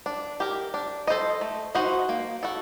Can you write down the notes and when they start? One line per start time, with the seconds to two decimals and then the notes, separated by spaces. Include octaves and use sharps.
0.06 D4
0.40 G4 A#4
0.74 D4
1.07 A4 C5 D#5
1.41 A3
1.75 D#4 F#4 C5 D#5
2.09 A#3
2.43 F#4 A4